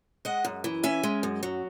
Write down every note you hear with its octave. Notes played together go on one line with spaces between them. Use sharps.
G#3 D#5 F#5
F#2
E3
C#4 E5 G#5
G#3
F#2
F#3